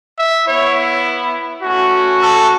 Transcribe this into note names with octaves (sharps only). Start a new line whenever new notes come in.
E5
B3 E4 C#5
A3 C#4 F#4
A4